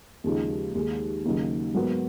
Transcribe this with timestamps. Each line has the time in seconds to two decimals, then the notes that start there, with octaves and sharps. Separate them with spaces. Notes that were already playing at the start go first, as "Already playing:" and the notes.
0.24 D#2 C#3 F3 G#3 D#4
0.75 D#2 D#3 G#3
1.25 D#2 C#3 F#3 A#3 D#4
1.75 G#2 F#3 B3 F#4 A#4